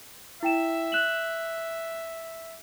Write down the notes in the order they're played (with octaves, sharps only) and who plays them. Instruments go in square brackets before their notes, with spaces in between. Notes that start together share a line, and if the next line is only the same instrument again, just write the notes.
[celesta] E4 G5 E7 [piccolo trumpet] E5
[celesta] F#6 E7 F#7